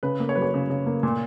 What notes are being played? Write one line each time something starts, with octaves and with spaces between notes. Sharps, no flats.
C#3 B4
A#3
C#5
F#3 B4
C#5
C#3
C#3
A#3
A#2